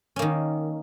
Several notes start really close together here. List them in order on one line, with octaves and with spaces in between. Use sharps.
C#4 A#3 D#3